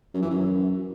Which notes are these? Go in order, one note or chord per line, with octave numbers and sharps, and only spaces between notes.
F#2
E3
F#2